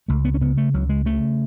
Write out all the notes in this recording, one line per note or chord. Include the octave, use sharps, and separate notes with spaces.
C#2 A3
B3
C#4
C#3 B3
A3
C#2 F#3
G#3
C#3 A3